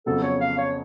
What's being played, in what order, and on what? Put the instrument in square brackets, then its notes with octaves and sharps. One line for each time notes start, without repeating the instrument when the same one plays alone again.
[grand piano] F2 C#3 F#3 B3 [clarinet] A4
[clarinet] C#5
F5
C#5